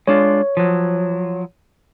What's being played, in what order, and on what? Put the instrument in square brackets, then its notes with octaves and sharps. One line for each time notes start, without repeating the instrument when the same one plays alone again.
[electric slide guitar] G#3 D4 F4 [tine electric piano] C#5
[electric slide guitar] F3 F#3